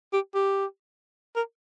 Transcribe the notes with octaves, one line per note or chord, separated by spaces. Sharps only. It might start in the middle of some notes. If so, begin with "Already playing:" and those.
G4
G4
A#4